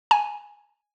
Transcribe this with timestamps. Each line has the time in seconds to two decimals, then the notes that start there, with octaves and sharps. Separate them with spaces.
0.11 G#5